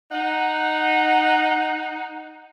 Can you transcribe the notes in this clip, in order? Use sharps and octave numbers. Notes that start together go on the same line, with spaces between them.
D#4 F#5